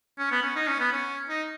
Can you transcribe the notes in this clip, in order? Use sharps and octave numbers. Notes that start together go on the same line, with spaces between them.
C#4
B3
C#4
D#4
C#4
B3
C#4
D#4